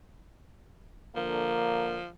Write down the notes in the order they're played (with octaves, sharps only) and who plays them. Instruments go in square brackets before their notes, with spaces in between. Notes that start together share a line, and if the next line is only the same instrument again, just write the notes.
[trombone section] D3 A#3 [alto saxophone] F3